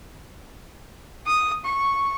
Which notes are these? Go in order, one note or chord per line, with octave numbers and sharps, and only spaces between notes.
D#6
C#6